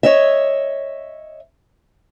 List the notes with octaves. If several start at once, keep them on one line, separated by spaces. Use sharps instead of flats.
C#5 D#5 E5